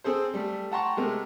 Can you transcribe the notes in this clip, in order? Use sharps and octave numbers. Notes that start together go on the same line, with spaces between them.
C4 G#4 A4 C5
G3 A3
F#5 G5 A5 A#5 C6 C#6
C3 G#3 A3 A#4